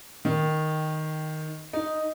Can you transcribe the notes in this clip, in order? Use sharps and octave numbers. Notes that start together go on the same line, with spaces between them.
D#3
D#4